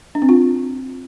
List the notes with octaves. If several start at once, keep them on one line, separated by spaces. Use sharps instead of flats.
D4
C4
F4